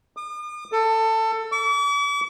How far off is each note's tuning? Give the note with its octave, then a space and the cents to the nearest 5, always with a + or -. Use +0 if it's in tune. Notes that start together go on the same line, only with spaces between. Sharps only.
D#6 -45
A4 +20
D6 -45